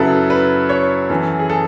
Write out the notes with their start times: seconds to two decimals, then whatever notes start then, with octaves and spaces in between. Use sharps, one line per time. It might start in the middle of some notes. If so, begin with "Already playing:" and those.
Already playing: F#2 C#3 F#3 E4 A4 B4
0.30 B4
0.69 C#5
1.09 F#2 E3 A4
1.39 G#4
1.50 A4